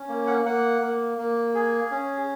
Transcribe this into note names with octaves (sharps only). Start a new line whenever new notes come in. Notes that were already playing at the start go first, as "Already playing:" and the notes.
Already playing: C#4
A#3
F#5
A#3 F#5
A#3
A#3
G#4
C#4